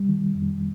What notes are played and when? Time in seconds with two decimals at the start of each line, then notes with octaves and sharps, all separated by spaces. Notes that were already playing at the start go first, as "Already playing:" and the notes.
Already playing: G3
0.09 D#3
0.35 F2